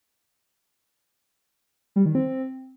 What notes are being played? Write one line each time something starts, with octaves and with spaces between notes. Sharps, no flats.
G3
D#3
C4